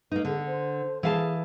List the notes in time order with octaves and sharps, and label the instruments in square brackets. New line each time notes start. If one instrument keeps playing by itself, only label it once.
[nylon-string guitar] A#3 D#4 [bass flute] B4
[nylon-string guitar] D3 [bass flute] G#4
[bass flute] C5
[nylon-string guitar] E3 F5 A5 [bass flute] G#4